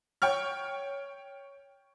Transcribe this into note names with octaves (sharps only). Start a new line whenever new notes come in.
C#5 G5 C#6 F6